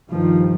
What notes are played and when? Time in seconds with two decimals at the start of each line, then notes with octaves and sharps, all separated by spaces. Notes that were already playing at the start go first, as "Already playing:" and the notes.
0.11 G2 D#3 F3